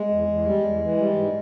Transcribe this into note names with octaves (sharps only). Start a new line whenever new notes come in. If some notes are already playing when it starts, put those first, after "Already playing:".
Already playing: G#3
E2
E2
G3
E2
E3
G3
G#2